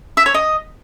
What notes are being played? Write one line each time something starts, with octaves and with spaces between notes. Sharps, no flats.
E5
C#5
D#5